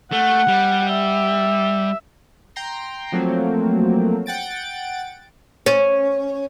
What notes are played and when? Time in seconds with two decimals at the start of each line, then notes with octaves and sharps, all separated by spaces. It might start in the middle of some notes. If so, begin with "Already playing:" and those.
0.12 A3 F#5
0.48 G3
0.90 E5
2.56 G5 A#5 C6
3.12 F3 F#3 A3 A#3 C4
4.26 F#5 G5 A6 D7
5.66 C#4 C#5